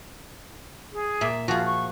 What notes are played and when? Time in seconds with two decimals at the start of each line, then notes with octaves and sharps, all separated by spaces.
0.93 G#4
1.21 A#2 E5
1.48 F3 F4 F#4 G#4
1.65 C#6